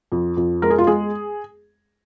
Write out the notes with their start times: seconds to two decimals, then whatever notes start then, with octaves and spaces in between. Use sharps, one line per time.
0.12 F2
0.37 F2
0.62 G#3 A#4
0.70 G#4
0.78 F4
0.87 G#3 G#4